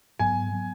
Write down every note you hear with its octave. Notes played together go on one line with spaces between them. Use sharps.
G#2 F#3 B3 G#5
F#3 B3